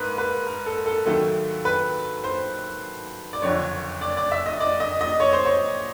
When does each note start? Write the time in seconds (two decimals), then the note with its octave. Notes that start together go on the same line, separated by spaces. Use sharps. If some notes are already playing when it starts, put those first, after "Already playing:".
Already playing: G#2 A#3 B4
0.18 B4
0.47 A#4
0.66 A4
0.86 A4
1.06 D#2 D#3 F#3 A3 A4
1.65 B4
2.24 C5
3.33 D5
3.42 F#1 F2 D3 C#5
4.01 D5
4.17 D5
4.32 E5
4.46 D#5
4.60 D5
4.80 D#5
5.01 D#5
5.20 C#5
5.33 C5
5.45 C#5